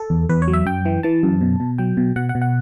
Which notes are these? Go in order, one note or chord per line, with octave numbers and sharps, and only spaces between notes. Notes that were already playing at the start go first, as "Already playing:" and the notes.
Already playing: A4
E2
E2 B4
C#5
F#3
E5
F#2 G5
E3
E3 A5
F#2
B2
B2
F#3 G5
B2
B2 F#5
F#5
B2
F#5